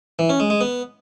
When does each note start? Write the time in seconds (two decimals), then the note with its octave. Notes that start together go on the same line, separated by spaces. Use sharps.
0.19 E3
0.29 C#4
0.40 G#3
0.50 G#3
0.61 B3